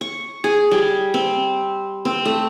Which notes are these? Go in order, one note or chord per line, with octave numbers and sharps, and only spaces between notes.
C#6
G#4
G3
C4
C4
A3